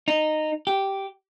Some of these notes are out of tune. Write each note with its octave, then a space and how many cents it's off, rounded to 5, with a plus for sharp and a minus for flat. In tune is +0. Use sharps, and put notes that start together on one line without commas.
D#4 -15
G4 -5